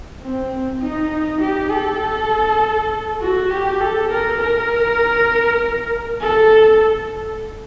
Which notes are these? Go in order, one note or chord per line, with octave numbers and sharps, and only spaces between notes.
C4
D#4
G4
A4
F#4
G4
A4
A#4
A#4
A4